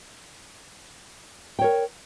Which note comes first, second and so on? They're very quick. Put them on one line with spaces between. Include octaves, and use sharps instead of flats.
G5 C#5 A#4